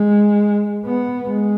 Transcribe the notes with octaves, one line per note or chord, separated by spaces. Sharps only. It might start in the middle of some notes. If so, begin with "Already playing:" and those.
Already playing: G#3
B3
G#3